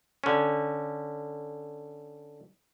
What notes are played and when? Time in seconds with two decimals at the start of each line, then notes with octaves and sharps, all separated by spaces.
0.24 D3 C#4